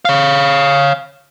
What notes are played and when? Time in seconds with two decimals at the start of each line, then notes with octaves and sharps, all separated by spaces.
0.05 C#5 F5